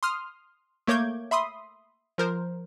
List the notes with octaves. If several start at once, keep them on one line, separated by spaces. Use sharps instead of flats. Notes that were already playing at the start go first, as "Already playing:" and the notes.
C6 D#6 F6
A3 A#3 C#5 D6 G6 G#6
E5 B5 C6 D#6
F3 A#4 C5